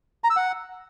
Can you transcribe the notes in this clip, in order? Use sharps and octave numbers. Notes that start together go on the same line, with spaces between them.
A#5
E6
F#5